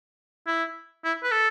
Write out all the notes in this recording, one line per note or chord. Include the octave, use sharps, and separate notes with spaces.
E4
E4
B4
A4